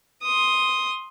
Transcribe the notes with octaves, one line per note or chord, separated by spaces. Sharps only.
C6 D#6